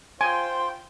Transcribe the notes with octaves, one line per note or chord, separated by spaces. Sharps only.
F4 C5 G5 G#5 C6